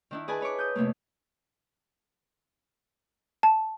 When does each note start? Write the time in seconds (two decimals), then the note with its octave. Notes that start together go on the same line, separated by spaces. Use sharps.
0.11 D#3 D4 E4
0.28 G#4 B4 D5 G#5 A5
0.41 B4 C#5 C#6 D6
0.59 D#6 G6
0.75 F2 C3 A3 A#3
3.43 A5